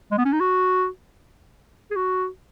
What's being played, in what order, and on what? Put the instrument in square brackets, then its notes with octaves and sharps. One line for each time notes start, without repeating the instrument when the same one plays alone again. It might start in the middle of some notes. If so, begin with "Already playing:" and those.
[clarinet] G#3
B3
C#4
D#4
F#4
G#4
F#4